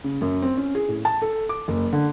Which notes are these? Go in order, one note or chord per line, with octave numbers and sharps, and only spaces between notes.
C#3
F#2
C4
C#4
G#4
A2
A5
A4
D6
F#1
D3